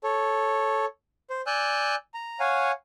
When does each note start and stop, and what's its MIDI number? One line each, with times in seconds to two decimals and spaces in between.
0.04 0.86 69
0.04 0.86 73
1.30 1.41 72
1.47 1.95 74
1.47 1.95 80
1.47 1.95 88
1.47 1.95 90
1.47 1.95 91
2.14 2.40 82
2.40 2.72 73
2.40 2.72 77
2.40 2.72 78
2.40 2.72 80